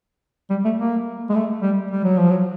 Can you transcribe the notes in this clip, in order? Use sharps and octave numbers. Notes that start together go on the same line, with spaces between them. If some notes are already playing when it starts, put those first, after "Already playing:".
G3
A3
A#3
G#3
A3
G3
G3
F#3
F3
F#3